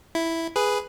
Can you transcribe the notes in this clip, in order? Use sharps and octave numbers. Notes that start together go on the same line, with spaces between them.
E4
G#4 B4